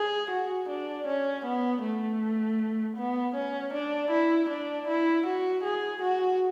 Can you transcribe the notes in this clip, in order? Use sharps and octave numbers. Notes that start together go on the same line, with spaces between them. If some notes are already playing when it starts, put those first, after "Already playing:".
Already playing: G#4
F#4
D4
C#4
B3
A3
B3
C#4
D4
E4
D4
E4
F#4
G#4
F#4